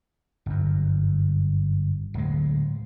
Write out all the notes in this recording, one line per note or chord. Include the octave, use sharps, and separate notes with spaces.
G1 F#2
D1 G#3